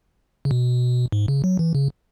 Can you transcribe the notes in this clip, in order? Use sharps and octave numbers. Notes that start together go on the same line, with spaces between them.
C#3
B2
G#2
C#3
F#3
E3
C#3